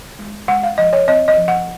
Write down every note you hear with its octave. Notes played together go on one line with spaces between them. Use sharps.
G#3
G#3 F#5
F5
F3 D#5
C#5
C4 D#5
D#5
F3
F#5